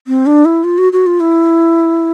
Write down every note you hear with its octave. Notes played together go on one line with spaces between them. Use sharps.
C4
D4
E4
F4
F#4
F#4
F4
E4